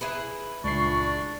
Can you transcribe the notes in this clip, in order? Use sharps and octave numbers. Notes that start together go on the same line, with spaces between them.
E4 G#4 B4
C#2 A#2 D4 D5 C#6 C7